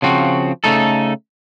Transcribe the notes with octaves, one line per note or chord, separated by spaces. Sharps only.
C#3 F3 C4 F#4
C#3 A3 D#4 A4